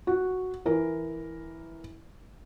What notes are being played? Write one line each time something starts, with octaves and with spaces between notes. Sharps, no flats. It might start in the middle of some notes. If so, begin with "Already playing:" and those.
F#4
E3 A#4